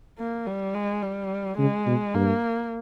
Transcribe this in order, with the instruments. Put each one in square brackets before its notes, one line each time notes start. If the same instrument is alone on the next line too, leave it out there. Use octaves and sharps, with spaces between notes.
[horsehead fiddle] A#3
G3
G#3
G3
[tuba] C#3 [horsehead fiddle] G#3
[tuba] B2
[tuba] G2 [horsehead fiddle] A#3